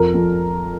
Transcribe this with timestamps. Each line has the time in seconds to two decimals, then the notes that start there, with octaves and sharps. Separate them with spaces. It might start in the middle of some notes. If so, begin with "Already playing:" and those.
Already playing: F2 A#4
0.14 F2